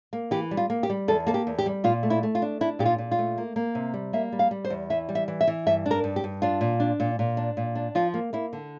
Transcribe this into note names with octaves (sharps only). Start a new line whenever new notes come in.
A#3
E3 G4
G3
F4
A#3
G4
G3
E2 A4
A#3 A4
G4
E2
G4
G3
A#2 F4
A3
E4
A3
F4
D4
D4 E4
A#2 G4
F4
A#2
F4
A3
A#3
A#3
C3
G3
A#3 E5
G3
F5
G3
C5
E2
E3 E5
G3
E5
E3
E5
E3
G2 E5
D4
A#4
G2
G4
G2
D4 F4
A#2
D4
A#2
A#2
D4
A#2
D4
F3 F4
A#3
A#3 E4
D3